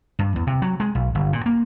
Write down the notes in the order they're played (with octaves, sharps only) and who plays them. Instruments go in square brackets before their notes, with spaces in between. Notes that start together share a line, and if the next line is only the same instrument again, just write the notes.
[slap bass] G2
E2
C3
F#3
G#3
B1
G1
A#2
A#3